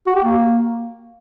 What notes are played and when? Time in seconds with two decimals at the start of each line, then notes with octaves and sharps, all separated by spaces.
0.07 F#4
0.16 G4
0.24 A#3